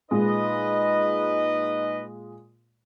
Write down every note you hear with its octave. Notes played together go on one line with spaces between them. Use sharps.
A#2 G#3 D#4 B4 D#5